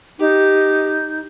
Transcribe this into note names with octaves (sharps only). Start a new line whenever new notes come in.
D#4 G4